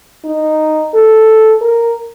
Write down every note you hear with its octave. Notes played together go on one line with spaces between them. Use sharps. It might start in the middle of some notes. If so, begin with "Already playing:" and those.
D#4
A4
A#4